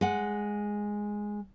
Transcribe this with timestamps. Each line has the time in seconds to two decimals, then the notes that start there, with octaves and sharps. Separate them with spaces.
0.01 G#3 F#5